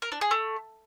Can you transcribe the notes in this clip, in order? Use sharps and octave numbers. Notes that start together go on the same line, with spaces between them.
A#4
D4
G#4
A3